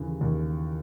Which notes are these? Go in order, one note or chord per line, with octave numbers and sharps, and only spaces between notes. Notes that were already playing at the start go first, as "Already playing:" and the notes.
Already playing: D#2 C#3 E3
D#2